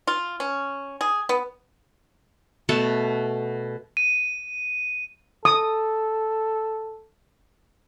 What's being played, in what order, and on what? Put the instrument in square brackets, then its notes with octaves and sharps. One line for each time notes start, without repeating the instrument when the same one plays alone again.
[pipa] F4
C#4
G#4
B3
[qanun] B2 A3 F#5 A5
[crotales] D#7
[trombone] A4 [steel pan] D#6